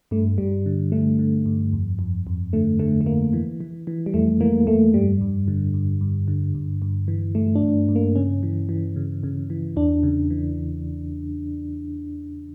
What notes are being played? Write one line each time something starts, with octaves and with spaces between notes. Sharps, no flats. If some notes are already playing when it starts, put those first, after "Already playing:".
G2 A3
G2 G3
D3
D3 A3
D3
G2
F2
F2
F2
D3 A3
D3 A3
A3
F2 A#3
E3
E3
E3
G3
F2 A3
E3 A#3
F2 A3
G2 G3
G2
D3
G2
G2
D3
G2
G2
E3
G2 A3
D4
G2
G2
A#3
C#3 C#4
E3
E3
C#3
C#3
E3
E2 D4
C#3
E3